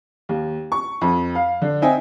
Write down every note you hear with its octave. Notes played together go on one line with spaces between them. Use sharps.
D#2
C#6
F2
F5
D3
C4 D#4 D#5 E5 G5 G#5